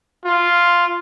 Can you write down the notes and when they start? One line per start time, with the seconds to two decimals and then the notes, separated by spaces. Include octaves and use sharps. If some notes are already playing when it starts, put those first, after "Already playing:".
0.25 F4